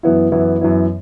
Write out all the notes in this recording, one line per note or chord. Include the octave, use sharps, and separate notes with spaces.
F#2 E3 B3 E4
F#2 E3 B3 E4
F#2 E3 B3 E4